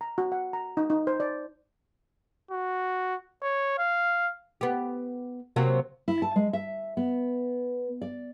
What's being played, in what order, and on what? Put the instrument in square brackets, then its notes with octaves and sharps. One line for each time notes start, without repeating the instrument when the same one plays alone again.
[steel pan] A#5
F#4
F#5
A#5
D#4
D#4
C5
D5
[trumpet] F#4
C#5
F5
[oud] B3 G4
C3 F#3 A#3
[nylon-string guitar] E4
A5
G#3
E5
B3
D5